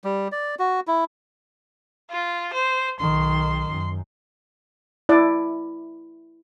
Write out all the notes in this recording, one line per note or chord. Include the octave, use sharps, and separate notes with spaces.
G3
D5
F#4
E4
F4
C5
B1 D#3 C6
F#2
E4 D5